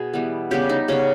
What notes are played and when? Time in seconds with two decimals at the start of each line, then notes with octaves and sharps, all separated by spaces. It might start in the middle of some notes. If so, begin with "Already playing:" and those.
Already playing: B2 G#4
0.13 E3 G3 B3
0.51 C#3 G3 B3 G4
0.69 D#4
0.88 C#3 G3 B3 C#4